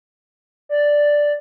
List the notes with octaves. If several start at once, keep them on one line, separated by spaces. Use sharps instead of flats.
D5